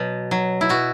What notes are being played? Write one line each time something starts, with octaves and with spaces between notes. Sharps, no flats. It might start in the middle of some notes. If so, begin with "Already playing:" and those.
Already playing: B2 F#3
F#3
E4
B2 F#4